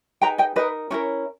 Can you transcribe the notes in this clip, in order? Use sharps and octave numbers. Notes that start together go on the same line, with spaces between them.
D#4 G#4 B4 G5 A#5
D#5 G5
D#4 A#4 B4 D#5
C#4 E4 A#4 C#5